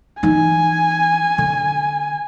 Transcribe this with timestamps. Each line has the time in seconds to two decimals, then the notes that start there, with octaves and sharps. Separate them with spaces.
0.23 E3 D#4 G#5
1.38 D3